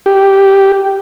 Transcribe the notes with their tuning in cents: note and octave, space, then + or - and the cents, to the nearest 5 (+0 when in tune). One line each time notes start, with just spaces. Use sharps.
G4 -5